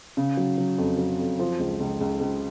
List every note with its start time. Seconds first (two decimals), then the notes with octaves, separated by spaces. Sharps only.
0.17 C#3
0.37 F#3
0.58 F#3
0.78 F2
0.99 F#3
1.19 F2
1.39 F3
1.60 C#2
1.80 C#2
2.01 C#2
2.21 C#2